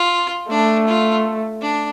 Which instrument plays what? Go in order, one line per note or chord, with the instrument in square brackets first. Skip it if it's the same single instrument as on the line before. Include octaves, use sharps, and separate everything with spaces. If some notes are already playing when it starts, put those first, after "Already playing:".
Already playing: [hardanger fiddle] F4
[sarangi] A3 [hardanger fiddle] D4
[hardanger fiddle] F4
D4